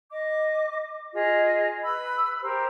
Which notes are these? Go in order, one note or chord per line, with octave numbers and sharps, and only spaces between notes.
D#5 D6
F4 G#4 D#5
B4 B5 E6
G4 A#4 C5